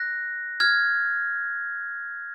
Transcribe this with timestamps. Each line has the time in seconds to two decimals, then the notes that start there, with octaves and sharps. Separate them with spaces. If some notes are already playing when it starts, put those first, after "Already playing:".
Already playing: F#6 A#6
0.60 F6 G#6